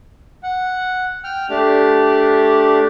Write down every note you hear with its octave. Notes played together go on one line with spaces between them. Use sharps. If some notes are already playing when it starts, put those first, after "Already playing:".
F#5
G5 F6
A3 D4 G4